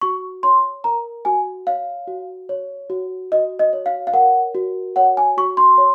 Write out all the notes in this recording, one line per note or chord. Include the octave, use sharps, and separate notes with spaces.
F#4 C#6
C#5 C6
A#4 A#5
F#4 G#5
C#5 F5
F#4
C#5
F#4
F#4 D#5
D#5
C#5
F5
F5
A#4 F#5
F#4
C#5 F#5
G#5
F#4 C#6
C6
C#5